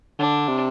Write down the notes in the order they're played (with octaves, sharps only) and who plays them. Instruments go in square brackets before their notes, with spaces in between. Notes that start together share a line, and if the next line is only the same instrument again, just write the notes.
[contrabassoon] D3 [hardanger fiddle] D4
[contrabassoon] C3